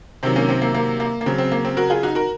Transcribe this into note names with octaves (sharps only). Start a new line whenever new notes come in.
C3 D#3 F#3 C4
A#3 C#4
C4
A#3
A#3
A#3
A#3
C#3 F#3 C4
C4
A#3
C4
F#4 A#4
F4 G#4
D#4 F#4
F#4 A#4